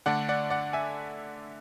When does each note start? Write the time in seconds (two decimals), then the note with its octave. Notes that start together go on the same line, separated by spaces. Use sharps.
0.06 D3 A3 D4 D5 F#5
0.29 D5 F#5
0.50 D5 F#5
0.73 E5 G#5